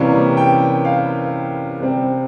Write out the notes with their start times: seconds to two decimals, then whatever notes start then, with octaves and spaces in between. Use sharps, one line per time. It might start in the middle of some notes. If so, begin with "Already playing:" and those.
Already playing: C3 E3 G3 A#3 C#4
0.37 G5
0.85 F5
1.79 C3 G3 C4